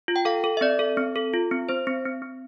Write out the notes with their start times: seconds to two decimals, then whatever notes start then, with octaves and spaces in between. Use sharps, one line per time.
0.08 F4
0.16 G5
0.25 A4 F5
0.44 A4
0.57 E5
0.61 C4 D5
0.79 A4
0.97 C4
1.16 A4
1.33 F4
1.51 C4
1.69 C4 C5
1.87 C4
2.05 C4
2.22 C4